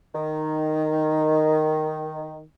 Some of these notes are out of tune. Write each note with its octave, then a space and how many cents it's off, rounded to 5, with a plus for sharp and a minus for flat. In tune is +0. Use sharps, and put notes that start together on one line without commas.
D#3 -5